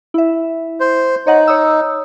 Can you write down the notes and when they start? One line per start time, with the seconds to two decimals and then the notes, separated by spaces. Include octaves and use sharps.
0.14 E4 E5
0.80 C5
1.27 D#4 C#5 D#5 F#5
1.47 C#5 D#6 E6